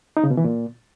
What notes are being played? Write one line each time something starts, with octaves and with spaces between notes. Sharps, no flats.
D#4
C#3
B2
E3
A#2